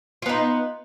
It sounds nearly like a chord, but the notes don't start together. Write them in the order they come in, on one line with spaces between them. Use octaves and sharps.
F4 B3 D#4